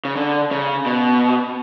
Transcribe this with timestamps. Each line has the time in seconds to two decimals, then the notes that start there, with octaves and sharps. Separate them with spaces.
0.05 C#3
0.16 D3
0.51 C#3
0.86 B2